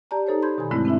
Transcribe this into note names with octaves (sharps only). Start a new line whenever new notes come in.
G4 D5 A5 A#5
D#4 A4 C5 C#5
B5 C6 G6 G#6
B2 D#3 G#5
G2 D3 G#3 A3 C4 E4
C4 D4 E4 E5